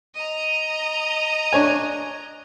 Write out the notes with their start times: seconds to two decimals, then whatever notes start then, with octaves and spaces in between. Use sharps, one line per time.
0.14 D#5 A#5
1.53 D4 C#5 G#5